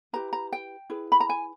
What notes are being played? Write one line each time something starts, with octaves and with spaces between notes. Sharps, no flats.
E4 G4 B4 A#5
A#5
G5
E4 G#4 B4
B5
A#5
G#5